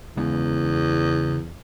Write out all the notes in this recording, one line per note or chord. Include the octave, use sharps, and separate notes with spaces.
E2 C#3 G#3 B3